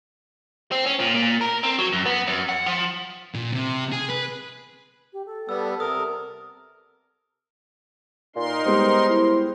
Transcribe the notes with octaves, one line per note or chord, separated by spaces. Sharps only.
C4
C#4
A#2
A#2
A#4
C4
F#3
F#2
B3
F#2
F#5
F3
A#2
C3
G#4
B4
G4
A4
G3 B3 E6
C3 A#4 D#6
A#2 D#4 A#4 C6
G3 G#3 B3 C5
E4